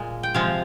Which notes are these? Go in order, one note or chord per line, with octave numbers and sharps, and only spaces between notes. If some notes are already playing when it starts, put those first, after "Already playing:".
Already playing: A#2 G#3
G5
C3 F3 G#3 F5